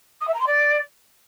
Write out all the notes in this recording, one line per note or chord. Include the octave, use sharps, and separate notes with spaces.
D#6
E5
A#5
C6
D5